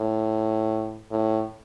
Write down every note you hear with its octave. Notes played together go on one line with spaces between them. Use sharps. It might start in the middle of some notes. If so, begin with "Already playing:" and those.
Already playing: A2
A2